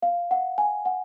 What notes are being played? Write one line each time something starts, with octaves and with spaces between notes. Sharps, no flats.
F5
F#5
G#5
F#5